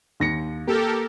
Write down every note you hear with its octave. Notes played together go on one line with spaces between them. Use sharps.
D#2 A#6 C#7
A#3 G4 A4 A#4